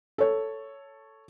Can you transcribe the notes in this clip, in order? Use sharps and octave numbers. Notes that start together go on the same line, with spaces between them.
A4 C#5